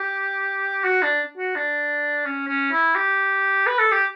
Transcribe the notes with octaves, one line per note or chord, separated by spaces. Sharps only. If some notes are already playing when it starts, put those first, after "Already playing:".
Already playing: G4
F#4
D4
F#4
D4
C#4
C#4
E4
G4
B4
A4
G4